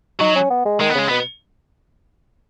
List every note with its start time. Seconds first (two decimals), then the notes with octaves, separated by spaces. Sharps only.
0.21 F#3 D#4
0.35 C#4
0.50 B3
0.65 G#3
0.80 D#3 G#3
0.89 B3
0.95 C#3 G#3
1.08 B2 B3